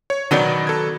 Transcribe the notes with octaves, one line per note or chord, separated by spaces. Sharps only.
C#5
B2 D#3 F#3 B3 D#4 D5
A4 G#6